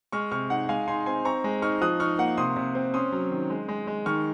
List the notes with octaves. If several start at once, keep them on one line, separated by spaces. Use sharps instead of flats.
G#3 C#6 F6
C3 C#6 F6
D#4 F#5
G#3 F5 G#5
D#4 G#5 C6
C4 G#5 C6
C4 A#5 C#6
G#3
D#4 C#6 F6
F3 D#6 F#6
D#4 C#6 F6
A#3 F#5
C3 C6 D#6
C3
C4
C#4 C6 D#6
F#3
D#3
G#3
G#3
G#3
D#3 C#6 F6